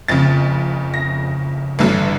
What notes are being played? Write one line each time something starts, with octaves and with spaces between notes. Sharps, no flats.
F#1 F2 C#3 A6
A#6
A1 G2 D3 F#3